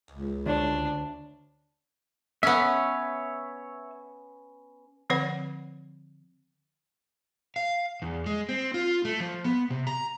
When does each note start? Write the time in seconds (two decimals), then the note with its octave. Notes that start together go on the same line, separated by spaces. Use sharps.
0.11 C#2
0.46 D2 D4 C#5
2.43 B3 C#4 C#5 E5
5.10 D3 F3 C4 B4 C#5 F#5
7.56 F5
8.02 E2
8.26 G#3
8.49 C4
8.74 F4
9.05 A3
9.20 F3
9.44 B3
9.71 C3
9.87 A#5